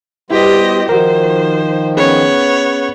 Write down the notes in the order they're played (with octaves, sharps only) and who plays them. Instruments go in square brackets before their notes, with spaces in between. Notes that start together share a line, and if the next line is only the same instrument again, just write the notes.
[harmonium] G3 B3 C5 [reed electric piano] E4 F#4 [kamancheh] G4 D#5
[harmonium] D#3 F3 [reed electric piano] F#4 A#4 [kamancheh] C5
[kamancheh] B3 C#5 [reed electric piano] C#4 G#4